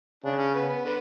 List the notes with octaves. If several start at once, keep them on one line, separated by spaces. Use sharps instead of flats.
C#3 D4
C#4
B3
B3
D3 B3